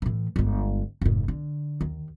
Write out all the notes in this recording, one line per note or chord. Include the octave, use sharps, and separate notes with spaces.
A2 E3
G1 G#3
F1 G#2
D3
D#2